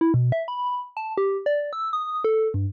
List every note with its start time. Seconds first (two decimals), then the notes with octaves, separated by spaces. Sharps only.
0.01 E4
0.14 B2
0.32 E5
0.48 B5
0.97 A5
1.18 G4
1.46 D5
1.73 E6
1.93 D#6
2.24 A4
2.54 G2